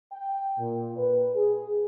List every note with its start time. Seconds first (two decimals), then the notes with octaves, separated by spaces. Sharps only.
0.12 G5
0.58 A#2
0.98 B4
1.36 G#4